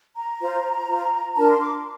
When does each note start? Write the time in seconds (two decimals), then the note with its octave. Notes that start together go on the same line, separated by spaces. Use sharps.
0.16 A#5
0.40 F4 C5
0.88 F4 C5
1.36 D4 F4 A#4 A5
1.49 C6
1.60 D6